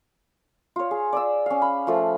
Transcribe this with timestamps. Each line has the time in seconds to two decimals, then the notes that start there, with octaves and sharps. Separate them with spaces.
0.76 F4 C#5
0.91 G#4
1.13 D5 D#6 E6
1.46 C#4 F5
1.62 B5
1.87 F3 A3